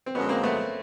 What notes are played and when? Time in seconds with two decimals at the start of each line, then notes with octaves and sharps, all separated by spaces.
0.06 C4
0.15 F#2 D3 F3 G#3 B3 C#4
0.29 A#3 C4
0.43 A3 B3